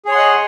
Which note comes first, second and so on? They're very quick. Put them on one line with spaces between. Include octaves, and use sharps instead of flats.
G#4 C#5 C6 F#5 D#5